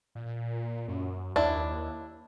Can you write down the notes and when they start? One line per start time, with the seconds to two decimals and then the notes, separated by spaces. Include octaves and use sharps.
0.15 A#2
0.88 F#2
1.36 D#2 D4 E4